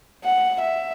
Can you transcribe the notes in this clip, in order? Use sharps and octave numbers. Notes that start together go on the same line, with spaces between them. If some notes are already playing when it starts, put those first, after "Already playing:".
F#5
E5